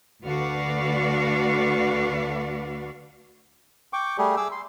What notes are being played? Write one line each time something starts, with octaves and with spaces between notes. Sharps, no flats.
D2 D3 F#4 B4 D5 F5
G5 C#6 D6
G3 A3 G4 G#4
G#4 D6 E6
C6